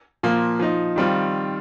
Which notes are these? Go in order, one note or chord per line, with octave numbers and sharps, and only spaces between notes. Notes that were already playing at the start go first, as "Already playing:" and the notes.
A#2 F3 A#3
F3 D#4
D#3 G3 C4 F4